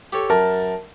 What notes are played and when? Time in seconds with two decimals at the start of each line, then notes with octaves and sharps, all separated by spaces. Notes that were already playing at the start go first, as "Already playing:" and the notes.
0.13 G4 A4 C#5
0.30 F#2 A#4 A5